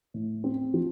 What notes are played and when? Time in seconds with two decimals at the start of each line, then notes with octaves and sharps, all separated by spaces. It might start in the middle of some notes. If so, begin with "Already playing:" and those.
0.14 A2
0.44 C4
0.74 F3